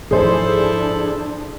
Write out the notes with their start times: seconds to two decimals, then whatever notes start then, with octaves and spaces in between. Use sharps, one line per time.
0.11 G#2 F3 D4 E4 G#4 A4 C5 D5